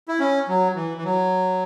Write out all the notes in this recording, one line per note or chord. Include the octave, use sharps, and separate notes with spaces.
E4
C#4
F#3
E3
E3
F#3